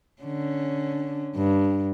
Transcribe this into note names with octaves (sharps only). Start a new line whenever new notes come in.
D3 C#4
G2